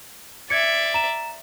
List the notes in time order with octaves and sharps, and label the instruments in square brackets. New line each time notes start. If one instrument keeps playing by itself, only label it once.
[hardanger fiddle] D5 E5 [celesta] G#6 C#7
[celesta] A#5 E7